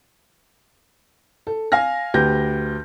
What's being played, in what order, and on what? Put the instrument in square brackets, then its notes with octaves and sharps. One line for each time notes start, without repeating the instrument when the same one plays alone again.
[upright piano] A4
F5 G#5 F6 A#6
D2 G4 B4 G6 A#6